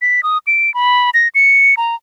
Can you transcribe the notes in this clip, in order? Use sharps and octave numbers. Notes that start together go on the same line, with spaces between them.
B6
D#6
D7
B5
A#6
C#7
A#5